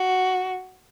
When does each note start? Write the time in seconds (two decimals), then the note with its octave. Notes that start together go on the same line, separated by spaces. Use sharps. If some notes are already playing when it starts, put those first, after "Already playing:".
Already playing: F#4